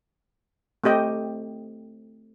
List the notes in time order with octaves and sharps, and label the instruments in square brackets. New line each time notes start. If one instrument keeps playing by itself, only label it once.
[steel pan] A3 C4 G4 D#5 G5